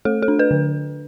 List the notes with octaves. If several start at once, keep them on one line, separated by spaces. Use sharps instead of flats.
A3 A4
A4
D4
B4
D3